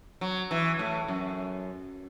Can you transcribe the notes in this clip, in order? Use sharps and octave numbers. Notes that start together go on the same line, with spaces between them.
F#3
E3
A2
F#2